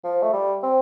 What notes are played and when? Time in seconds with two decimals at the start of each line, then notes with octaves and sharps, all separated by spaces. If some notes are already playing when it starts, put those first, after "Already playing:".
0.04 F3
0.22 A3
0.33 G3
0.63 C4